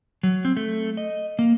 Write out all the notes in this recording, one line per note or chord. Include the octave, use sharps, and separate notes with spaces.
F#3
C4
A3
D#5
A#3